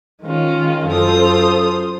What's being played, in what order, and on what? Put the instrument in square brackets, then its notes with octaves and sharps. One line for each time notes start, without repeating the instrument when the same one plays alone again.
[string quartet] D#3 C#4 [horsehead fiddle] G#3 F4
[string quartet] F#2 F4 D#6 [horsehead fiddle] A4 C5